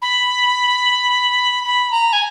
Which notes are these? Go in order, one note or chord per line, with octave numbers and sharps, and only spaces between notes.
B5
B5
A#5
G#5